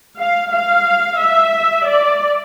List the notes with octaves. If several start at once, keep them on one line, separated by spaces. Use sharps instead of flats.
F5
F5
E5
D5